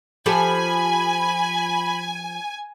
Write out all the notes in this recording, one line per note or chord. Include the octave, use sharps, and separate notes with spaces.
F3 G4 A4 G#5 B5